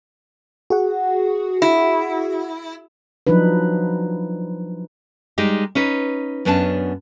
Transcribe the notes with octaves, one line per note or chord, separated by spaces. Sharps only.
F#4 G#4 F#5
E4
F3 F#3 D4 D#4 B4
G3 G#3 D#4 G4
C#4 D#4 B4
F#2 B3 C#4 D4 G5 A5